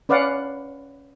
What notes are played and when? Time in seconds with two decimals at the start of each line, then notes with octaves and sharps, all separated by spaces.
0.09 C#4 B4 D5 F5 F#5